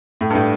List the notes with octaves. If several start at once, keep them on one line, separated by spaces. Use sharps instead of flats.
A2
G2
A2